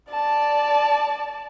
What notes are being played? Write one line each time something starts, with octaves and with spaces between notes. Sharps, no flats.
D5 A5